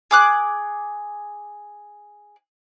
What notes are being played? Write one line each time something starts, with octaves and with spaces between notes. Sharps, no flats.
G#4 D6 F#6